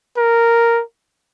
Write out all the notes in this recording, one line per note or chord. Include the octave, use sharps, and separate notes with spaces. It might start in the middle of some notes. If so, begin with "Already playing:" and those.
A#4